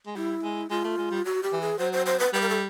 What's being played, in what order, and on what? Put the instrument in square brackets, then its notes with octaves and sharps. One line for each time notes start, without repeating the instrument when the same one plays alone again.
[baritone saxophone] G#3
[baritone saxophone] G3 [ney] E4
[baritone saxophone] G#3
[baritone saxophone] G#3 [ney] F4
[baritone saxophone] A3
G#3
G3
[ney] F#4
G4
[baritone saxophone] E3
[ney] G#4
[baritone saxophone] F#3 [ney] C5
[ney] C5
C5
B4
[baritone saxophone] G3 [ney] B4
[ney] A#4
A4